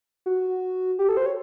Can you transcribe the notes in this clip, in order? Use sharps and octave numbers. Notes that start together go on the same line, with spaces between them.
F#4
G4
A4
C5
C#5